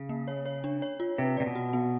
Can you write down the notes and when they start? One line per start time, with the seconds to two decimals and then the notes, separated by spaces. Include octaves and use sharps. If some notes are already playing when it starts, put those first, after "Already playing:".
Already playing: C#3
0.09 A#3
0.28 C#5
0.46 C#5
0.64 D4
0.82 C#5
1.00 F4
1.18 C3 B4
1.37 C3 D5
1.46 B2
1.55 F#4
1.73 B3